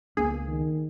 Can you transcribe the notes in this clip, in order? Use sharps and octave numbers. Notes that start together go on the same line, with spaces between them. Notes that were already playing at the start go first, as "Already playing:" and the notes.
C#2 A#3 B3 D4 G#4
D#3